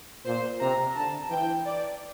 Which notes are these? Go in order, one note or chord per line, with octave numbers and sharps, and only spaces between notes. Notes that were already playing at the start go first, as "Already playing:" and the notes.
A#2 C5
C3 A#5
D3 A5
E3 G5
D5